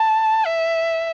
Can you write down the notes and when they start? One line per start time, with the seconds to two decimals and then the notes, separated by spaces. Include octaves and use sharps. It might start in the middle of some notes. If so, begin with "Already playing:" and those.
Already playing: A5
0.46 E5